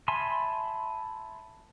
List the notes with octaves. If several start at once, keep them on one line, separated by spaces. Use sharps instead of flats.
E5 G#5 A5 B5 C6